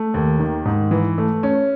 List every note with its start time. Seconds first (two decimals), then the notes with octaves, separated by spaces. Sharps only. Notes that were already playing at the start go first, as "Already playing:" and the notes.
Already playing: A3
0.14 D#2
0.39 D#3
0.65 G#2
0.91 E3
1.18 A3
1.43 C#4